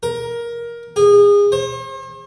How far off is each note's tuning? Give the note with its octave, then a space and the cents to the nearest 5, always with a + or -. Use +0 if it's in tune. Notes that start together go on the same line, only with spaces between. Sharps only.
A#4 +15
G#4 -30
C5 +45